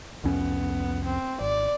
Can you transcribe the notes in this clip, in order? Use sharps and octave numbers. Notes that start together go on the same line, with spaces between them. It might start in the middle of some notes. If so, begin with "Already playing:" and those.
C2 F2 B3 C#4
C4
G#1 D5